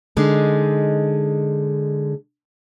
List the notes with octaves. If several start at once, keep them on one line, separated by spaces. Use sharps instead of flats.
D3 G#3 D#4